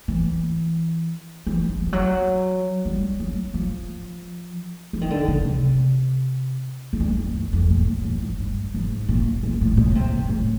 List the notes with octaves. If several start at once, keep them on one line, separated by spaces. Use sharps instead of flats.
E3
E3
F3
F3
F#3
G3
F#3
F3
E3
D#3
D3
C#3
C3
G#2
G2
G2
F#2
F2
A#2
A2
A#2
A2
G2
G#2
A#2
A#2
A2
A#2
C#3
C3
A#2
A2